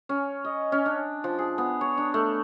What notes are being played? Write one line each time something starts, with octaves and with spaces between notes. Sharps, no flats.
C#4
D#5
C#4
D4
F3
G#4
B3
C#5
D4
A3